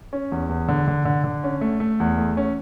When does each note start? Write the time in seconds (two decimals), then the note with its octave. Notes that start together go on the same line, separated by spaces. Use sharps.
0.13 C#4
0.32 E2
0.49 E2
0.68 D3
0.88 D3
1.05 D3
1.24 D3
1.44 C#4
1.61 A3
1.80 A3
2.00 E2
2.18 A3
2.37 C#4